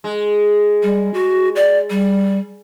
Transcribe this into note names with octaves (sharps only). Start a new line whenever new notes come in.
G#3
G3
F#4
D5
G3